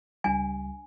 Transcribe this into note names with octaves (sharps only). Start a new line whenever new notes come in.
C#2 G3 D4 G#5